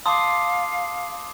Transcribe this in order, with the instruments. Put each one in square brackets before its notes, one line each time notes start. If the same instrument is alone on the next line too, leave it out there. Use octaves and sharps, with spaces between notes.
[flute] F5 [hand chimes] A5 C6 [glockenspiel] D6 D#6